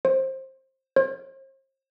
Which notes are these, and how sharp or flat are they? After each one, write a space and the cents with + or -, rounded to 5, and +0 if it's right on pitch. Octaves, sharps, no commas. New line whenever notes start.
C5 +20
C5 +40